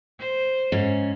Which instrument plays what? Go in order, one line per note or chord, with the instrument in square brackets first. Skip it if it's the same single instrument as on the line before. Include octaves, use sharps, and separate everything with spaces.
[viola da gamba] C5
[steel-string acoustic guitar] G#2 C#4